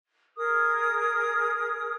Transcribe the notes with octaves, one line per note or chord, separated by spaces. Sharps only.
G#4 A#4 D#6